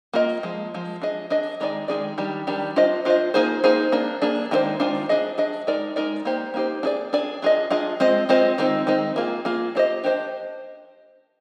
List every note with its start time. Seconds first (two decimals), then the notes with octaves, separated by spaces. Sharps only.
0.13 A#3 F4 A#4 D#5
0.43 F3 G#3
0.74 F3 G#3
1.02 D4 G#4 D#5
1.30 D4 G#4 D#5
1.60 D#3 G#3 D#4 G#4 D5
1.88 D#3 G#3 D#4 G#4 D5
2.18 D#3 G3 D4 G4
2.47 D#3 G3 D4 G4
2.76 D4 F4 C5 D#5
3.05 D4 F4 C5 D#5
3.34 A#3 D#4 G#4 C5
3.64 A#3 D#4 G#4 C5
3.92 A#3 D4 G#4
4.22 A#3 D4 G#4
4.51 D#3 G#3 D4 F4 C5
4.80 D#3 G#3 D4 F4 C5
5.09 D4 G#4 D#5
5.38 D4 G#4 D#5
5.67 G#3 D#4 A#4 D5
5.96 G#3 D#4 A#4 D5
6.25 A#3 D#4 G4 C5
6.54 A#3 D#4 G4 C5
6.83 D4 G#4 D5
7.13 D4 G#4 D5
7.42 D4 F4 G#4 D#5
7.70 D4 F4 G#4 D#5
8.00 G#3 C4 F4 C5 D#5
8.29 G#3 C4 F4 C5 D#5
8.58 D#3 G#3 C4 D#4
8.87 D#3 G#3 C4 D#4
9.16 A#3 F4 G#4
9.45 A#3 F4 G#4
9.75 D4 G4 C5 D#5
10.04 D4 G4 C5 D#5